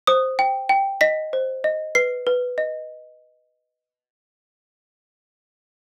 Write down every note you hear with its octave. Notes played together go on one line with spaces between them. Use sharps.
C5 D#6
G5
G5
D#5 B6
C5
D#5
B4 C7
B4
D#5